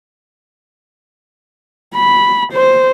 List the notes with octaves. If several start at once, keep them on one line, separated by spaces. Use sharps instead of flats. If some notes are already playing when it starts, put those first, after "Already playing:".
B5
C5